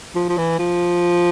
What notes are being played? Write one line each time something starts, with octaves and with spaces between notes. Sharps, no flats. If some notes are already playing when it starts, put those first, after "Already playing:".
F3
F3
E3
F3